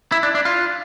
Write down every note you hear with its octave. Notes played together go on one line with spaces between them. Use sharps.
E4
D4
D4
F4